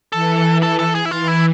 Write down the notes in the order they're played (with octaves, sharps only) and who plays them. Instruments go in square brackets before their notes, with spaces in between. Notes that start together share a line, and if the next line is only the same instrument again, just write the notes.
[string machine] E3 [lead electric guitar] A4
[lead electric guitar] A4
A4
G#4
E4
[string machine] E3 [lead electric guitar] F4
[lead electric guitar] E4